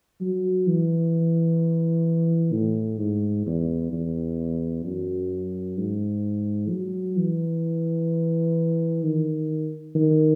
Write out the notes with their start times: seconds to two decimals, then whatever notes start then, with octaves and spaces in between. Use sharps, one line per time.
0.21 F#3
0.67 E3
2.53 A2
2.99 G#2
3.46 E2
3.93 E2
4.85 F#2
5.78 G#2
6.70 F#3
7.17 E3
9.03 D#3
9.95 D#3